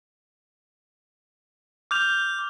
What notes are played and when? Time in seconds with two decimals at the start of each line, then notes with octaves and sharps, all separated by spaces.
1.91 D6 F6 G6 F7